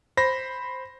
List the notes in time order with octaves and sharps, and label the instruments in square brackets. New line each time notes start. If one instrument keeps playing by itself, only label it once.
[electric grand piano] C5 B5 A#6